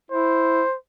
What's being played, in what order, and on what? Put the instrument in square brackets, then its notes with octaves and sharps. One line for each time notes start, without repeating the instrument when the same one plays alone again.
[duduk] E4 [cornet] C5